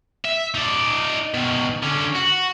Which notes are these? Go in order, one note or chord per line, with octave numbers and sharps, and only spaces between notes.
E5
D#4 D5
B2 D#3
D3 C#4
F#4